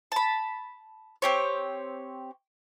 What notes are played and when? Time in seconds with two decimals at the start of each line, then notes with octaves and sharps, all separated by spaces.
0.12 A5 B5
1.22 C4 G4 C#5